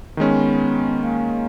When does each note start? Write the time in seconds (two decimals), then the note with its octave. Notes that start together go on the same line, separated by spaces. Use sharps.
0.17 D#3 G#3 B3 C#4
1.02 A#3